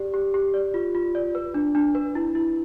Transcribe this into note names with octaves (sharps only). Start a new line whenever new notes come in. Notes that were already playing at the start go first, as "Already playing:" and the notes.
Already playing: G4 D5
G4
G4
D5
F4
F4
D5
B4
D4
D4
B4
E4
E4